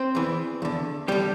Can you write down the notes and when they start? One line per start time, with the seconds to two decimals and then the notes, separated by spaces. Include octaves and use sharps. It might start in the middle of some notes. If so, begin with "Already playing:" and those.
Already playing: C4 C5
0.15 E2 E3
0.62 E2 D3
1.08 E2 D3 G3 G4